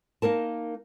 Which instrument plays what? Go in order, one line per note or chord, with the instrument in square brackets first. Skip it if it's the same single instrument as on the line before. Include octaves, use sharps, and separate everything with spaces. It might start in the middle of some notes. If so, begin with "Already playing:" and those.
[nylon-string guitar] A#3 D#4 A#4 A5